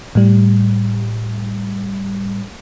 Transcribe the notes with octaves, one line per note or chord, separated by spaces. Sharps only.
A2 G3